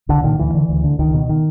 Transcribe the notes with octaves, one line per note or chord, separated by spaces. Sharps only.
C2 D3
A#2 D#3
D2 E3
D3
D2
D3
C#2 D#3
B2
D#3